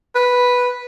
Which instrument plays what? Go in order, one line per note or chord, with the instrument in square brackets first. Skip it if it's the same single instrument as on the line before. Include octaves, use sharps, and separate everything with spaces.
[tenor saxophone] B4